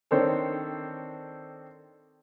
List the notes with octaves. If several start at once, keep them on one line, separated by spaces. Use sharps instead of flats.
D#3 C4 D4 A4 C5 C#5